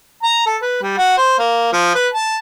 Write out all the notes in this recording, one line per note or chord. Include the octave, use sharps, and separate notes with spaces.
A#5
A4
B4
G3
F#4
C5
A#3
F3
B4
A5